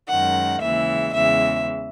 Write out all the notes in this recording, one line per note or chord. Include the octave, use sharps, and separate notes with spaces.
F#2 D#3 G#3 F#5
D#2 C#3 E3 G#3 E5
E2 C#3 E3 G#3 E5